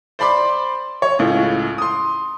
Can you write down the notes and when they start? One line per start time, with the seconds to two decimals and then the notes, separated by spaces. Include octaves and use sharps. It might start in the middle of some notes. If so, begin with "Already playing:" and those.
0.19 C5 D5 B5 C6 D6
1.02 C#5
1.19 C#2 A2
1.78 C6 D#6